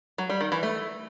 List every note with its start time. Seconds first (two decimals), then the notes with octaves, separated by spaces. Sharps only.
0.18 F#3
0.29 G3
0.41 D#3
0.52 E3
0.63 A3